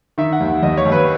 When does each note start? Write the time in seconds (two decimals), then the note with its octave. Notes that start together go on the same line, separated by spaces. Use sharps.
0.18 D#3 E5
0.33 F#5
0.40 D#2
0.62 D#2 D#5
0.77 C#5
0.85 D#2
0.92 B4